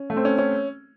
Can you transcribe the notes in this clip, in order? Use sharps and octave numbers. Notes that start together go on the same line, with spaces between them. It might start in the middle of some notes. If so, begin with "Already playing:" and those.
Already playing: C#4
A3
C4
C#4
C#4